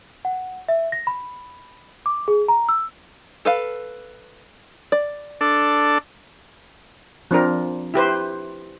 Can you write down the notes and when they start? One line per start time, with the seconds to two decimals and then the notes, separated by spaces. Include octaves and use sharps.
0.25 F#5
0.68 E5
0.92 A#6
1.07 B5
2.06 D6
2.28 G#4
2.48 A#5
2.69 E6
3.45 A4 B4 F5
4.92 D5
5.41 D4 A4
7.31 F3 C4 D4 A#4
7.94 E4 G4 B4 C5